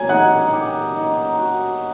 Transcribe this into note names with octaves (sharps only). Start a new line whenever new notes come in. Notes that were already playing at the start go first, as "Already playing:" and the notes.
Already playing: A#3 C#4 G#5 G#6
D#4 F#5 F#6
G4
D#4
F#4